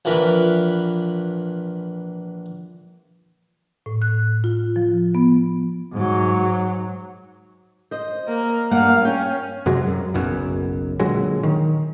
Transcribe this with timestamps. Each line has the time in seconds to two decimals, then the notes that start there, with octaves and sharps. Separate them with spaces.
0.05 A#1 E3 A#4 B4
3.86 A2
4.02 F#6
4.44 F4
4.76 F3
5.15 B3
5.93 G#2 F#3
7.91 C5 D#5
8.27 A#3
8.71 G2 A#3 F5 F#5
9.05 C#4 G5
9.66 F#2 C3 F#3 G#3
9.87 F#2
10.14 F#1 B1 F#2
11.00 A#2 D3 F#3 G#3
11.43 D#3